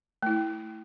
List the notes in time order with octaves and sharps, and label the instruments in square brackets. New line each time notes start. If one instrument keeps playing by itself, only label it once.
[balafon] A3 E4